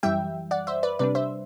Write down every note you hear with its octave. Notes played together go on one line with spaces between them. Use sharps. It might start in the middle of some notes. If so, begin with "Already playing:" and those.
F#2 E3 G3 E5 G5
D5 F#5
C5 E5
B4 D5
C3 G3 D4 B4 D5
C5 E5